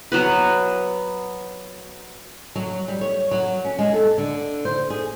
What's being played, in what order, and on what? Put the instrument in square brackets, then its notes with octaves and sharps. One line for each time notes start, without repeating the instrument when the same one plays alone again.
[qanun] F#3 B3 B4
[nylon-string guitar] F#3
G3
C#5
F#3
C#4
G#3
A4
D3
C5
G#4